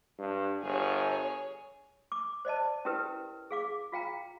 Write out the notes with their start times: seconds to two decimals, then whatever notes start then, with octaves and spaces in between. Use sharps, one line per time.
0.19 G2
0.63 G1 G#4 C#5
2.12 D6
2.45 C5 D5 D#5 A5
2.85 C#4 E4 G4 A#4 B4
3.51 G#4 F5 D6
3.92 F4 F5 G5 A#5